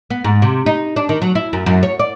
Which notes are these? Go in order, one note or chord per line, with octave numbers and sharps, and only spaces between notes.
B3
G#2
C3
D#4
D4
D#3
F#3
E4
F#2
F#2
C#5
D5